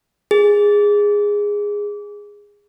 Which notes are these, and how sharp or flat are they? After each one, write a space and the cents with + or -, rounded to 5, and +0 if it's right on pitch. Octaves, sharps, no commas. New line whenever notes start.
G#4 -10